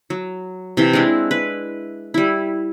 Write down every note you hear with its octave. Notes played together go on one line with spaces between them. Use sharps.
F#3
C3 E3 G5
G#3 C4 D4 E4
B4
G3 E4